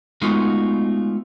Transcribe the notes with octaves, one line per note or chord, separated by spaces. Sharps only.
G#3 A3 B3 D#4 F4 F#4